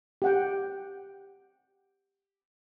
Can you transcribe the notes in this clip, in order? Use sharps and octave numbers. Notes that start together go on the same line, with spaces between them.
G4 F#5 G5